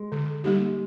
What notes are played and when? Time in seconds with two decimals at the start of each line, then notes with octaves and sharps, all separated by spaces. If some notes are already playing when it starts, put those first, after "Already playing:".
Already playing: G#3
0.12 D3
0.44 G3 A#3 D#4 G4